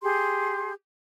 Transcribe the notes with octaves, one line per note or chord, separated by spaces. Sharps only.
G4 G#4 C6